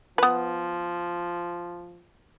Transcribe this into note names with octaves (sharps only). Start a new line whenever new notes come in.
F3 B3 B4